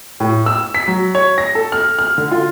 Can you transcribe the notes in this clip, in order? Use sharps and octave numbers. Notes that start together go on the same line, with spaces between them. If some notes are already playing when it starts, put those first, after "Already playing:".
A2
E6
B6
F#3
C#5
A#6
A4
F6
F6
D3
F4